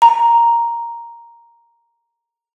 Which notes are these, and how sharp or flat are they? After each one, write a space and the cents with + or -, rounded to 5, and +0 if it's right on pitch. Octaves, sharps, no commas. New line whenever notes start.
A#5 +0